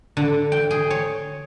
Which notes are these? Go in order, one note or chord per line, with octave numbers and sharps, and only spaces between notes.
D3
G5
G#4
C#5